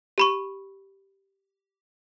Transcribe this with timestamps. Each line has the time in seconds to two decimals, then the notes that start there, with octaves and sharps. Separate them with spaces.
0.18 G4 B5 C#6